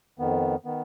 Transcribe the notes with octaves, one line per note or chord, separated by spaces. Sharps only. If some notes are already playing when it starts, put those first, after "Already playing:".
F2 D#3 B3
D#3 B3